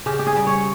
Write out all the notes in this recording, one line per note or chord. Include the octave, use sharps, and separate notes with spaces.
C#3 G4
G4
G#4
G3
C#5